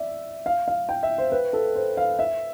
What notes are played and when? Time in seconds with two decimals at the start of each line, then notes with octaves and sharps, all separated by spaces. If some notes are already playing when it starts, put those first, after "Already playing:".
Already playing: D5 E5
0.46 F5
0.68 F5
0.89 G5
1.03 E5
1.18 C5
1.32 B4
1.53 A4
1.75 C5
1.97 F5
2.19 E5